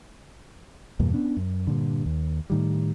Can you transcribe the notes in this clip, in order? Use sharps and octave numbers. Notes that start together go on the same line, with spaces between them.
E2 G2 B2 A#3
B3 C#4 D4
F#2
G2 A#2 D3
D#2
A2 D#3 G3